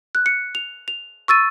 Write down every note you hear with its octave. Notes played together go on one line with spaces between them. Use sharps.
F#6
C#7
F7
F7
C#6 E6 A6 D#7